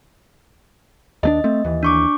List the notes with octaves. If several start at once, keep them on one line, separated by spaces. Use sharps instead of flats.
D#2 A3 D4 D#5
A3 C4
D#2 E3
D4 C#6 D6